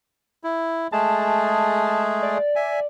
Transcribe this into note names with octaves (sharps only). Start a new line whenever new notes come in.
E4
G#3 A3 G#4 A5
D5
E5 G#5